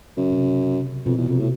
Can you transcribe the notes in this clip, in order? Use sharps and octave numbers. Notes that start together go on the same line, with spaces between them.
F#2 C#3
C3
C3
F2 B2
E2
F2 C3
A2